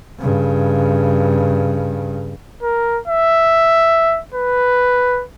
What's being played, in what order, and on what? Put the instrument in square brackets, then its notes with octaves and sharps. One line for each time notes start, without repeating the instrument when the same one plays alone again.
[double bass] G2 C#3
[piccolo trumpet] A#4
E5
B4